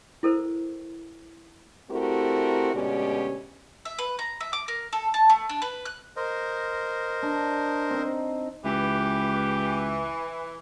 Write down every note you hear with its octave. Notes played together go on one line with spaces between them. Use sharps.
E4 A4 A#4 C5
A3 C4 E4 F#4 G4 A#4
D2 B2 G#3 C#4 G4 D5
E5
B4
A#5
E5
D6
A#4
A4
A5
A3
D4
B4
F#6
A#4 C5 D#5
D4
C4 D#4
C#2 E3 G4